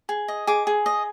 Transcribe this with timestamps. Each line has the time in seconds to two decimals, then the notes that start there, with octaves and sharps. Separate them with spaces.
0.09 G#4
0.28 D#5
0.47 G#4 D6
0.67 G#4
0.86 D#5